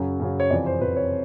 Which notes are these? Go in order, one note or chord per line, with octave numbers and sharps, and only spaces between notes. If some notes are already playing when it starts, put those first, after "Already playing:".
Already playing: F#2 C#3 F#3
F#2 C#3 F#3
C#5
F2 C3 E3 D5
C5
F2 C3 E3 B4
C#5